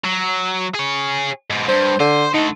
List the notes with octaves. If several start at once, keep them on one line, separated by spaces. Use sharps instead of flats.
F#3
G#4 C#5
G#2 B2
G2 C5
D3 C5
D3 A3 D#4